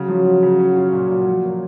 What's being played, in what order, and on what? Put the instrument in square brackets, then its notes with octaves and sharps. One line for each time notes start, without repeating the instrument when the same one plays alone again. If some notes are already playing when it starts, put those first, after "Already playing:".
Already playing: [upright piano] C#3 [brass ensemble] F#3
[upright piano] F3
F3
C#3
C#4
F4
A#2
A#2
F3
A#3